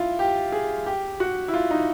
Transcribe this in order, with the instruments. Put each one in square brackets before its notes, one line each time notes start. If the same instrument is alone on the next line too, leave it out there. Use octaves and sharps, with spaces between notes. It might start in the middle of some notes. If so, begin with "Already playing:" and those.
Already playing: [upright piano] E4 F4
G4
G#4
G4
F#4
E4
F4
D#4